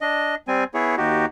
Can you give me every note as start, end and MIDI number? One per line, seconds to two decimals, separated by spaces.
0.01 0.35 62
0.01 0.35 75
0.48 0.64 55
0.48 0.64 60
0.48 0.64 80
0.74 0.96 59
0.74 0.96 64
0.74 0.96 68
0.74 0.96 73
0.97 1.26 39
0.97 1.26 63
0.97 1.26 66
0.97 1.26 67